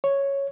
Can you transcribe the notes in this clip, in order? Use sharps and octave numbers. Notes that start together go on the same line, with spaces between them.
C#5